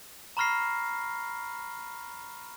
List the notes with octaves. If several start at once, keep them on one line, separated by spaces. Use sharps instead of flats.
A#5 B5 C#6 F6 A#6 C7